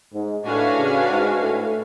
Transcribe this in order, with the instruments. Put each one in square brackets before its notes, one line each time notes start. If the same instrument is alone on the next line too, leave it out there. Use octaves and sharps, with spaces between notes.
[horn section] G#2
[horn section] A2 [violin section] D4 F#4 B4 F5 G#5
[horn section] C#3
G#2
A2